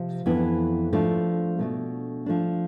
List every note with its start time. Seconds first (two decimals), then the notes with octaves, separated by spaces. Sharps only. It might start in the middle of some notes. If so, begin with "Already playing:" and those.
Already playing: C3 F3 F4 C5
0.26 F2 E3 B3 E4
0.93 F3 A3 D4
1.59 B2 A3 D4
2.26 F3 A3 D4